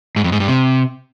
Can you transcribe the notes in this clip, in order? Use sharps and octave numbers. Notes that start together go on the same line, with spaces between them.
G#2
F2
G#2
G2
C3